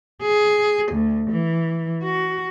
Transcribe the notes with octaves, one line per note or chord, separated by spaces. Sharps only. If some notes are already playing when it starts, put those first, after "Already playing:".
G#4
D2
E3
F#4